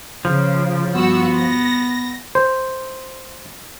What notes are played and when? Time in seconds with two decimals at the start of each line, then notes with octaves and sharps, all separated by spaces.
0.25 C#3 F3
0.95 G2 B3 F#4 E6
1.35 A#6
2.35 C5